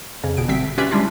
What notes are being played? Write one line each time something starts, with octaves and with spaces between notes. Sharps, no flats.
F2 C#3
G1 B2 D7
D3 G3 C4 E5 B6
C#4 F4 G4 B4 D5 E5
G3 G#3 C#4 D4 E4 F4